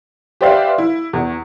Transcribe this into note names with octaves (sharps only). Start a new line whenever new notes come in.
G4 B4 C5 D5 E5 F5
E4
E2